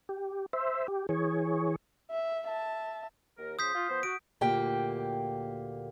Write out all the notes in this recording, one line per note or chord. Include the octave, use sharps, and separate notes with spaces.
G4
C5 E5
G4
E3 G#4 C#5
E5
E5 A5
D#2 A#4
C#3 F3 C5 D#6 G6 B6
F4
F3 B3 C5
F#4 D7
D2 A#2 A#3 G4 G5